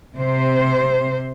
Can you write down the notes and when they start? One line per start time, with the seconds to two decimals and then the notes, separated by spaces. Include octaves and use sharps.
0.16 C3 C5